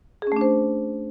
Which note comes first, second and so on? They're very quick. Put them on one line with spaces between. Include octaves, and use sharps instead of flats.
G#4 C#4 A3 D4 C5